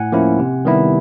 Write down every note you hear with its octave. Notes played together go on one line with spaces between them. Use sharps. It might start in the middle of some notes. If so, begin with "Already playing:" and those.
Already playing: A2 F#5 G#5
F3 A#3 C#4 E4
C3
D#3 G3 B3 E4